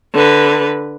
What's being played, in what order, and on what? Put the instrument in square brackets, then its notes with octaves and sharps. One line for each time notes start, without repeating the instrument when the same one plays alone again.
[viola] D3 B4